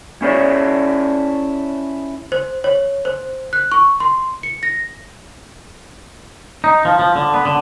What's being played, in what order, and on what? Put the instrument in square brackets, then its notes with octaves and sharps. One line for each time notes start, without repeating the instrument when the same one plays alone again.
[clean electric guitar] C#4 E4 G#4 C#5 D5
[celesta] C5
C#5
C5
F#6
C#6
C6
C#7
A#6
[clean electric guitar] D#4
F3
F3
D3
B3
D3